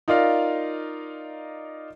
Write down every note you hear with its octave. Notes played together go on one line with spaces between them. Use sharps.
D#4 F4 A#4 D5 F5